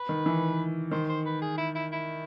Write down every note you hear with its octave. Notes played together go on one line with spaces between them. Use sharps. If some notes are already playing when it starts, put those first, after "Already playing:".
Already playing: B4
D#3
E3
D#3 C5
C5
B4
G#4
E4
E4
E4